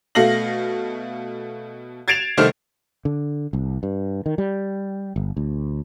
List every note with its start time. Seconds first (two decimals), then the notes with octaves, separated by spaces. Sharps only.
0.15 B2 A3 F5 A#6 F#7
2.08 G#6 A6 C7 D7 E7 F7
2.38 C2 D#3 A3 C5 F6
3.05 D3
3.53 C2
3.83 G2
4.26 D#3
4.38 G3
5.16 G1
5.37 D2